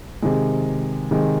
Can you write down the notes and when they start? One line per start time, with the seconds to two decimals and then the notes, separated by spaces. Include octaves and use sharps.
0.22 C3 D#3 G#3
1.11 C3 D#3 G#3